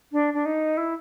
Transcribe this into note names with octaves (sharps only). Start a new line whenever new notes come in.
D4
D4
D#4
E4